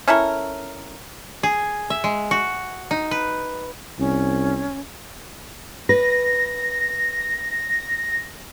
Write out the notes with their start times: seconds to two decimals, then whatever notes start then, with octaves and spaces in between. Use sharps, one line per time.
0.07 C#4 E4 A4 A#4
1.43 G#4
1.90 E5
2.04 G#3
2.31 F#4
2.91 D#4
3.11 B4
3.99 C2 C#4
5.89 B4 A#6